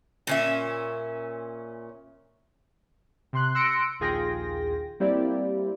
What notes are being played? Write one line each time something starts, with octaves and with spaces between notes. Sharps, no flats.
A#2 C#4 E5
C3 C6 F#6
C6 E6 F#6 A#6 C#7 D7
A#1 D#2 F4 G#4 G5 A#6
G3 A#3 C4 E4 G4 D5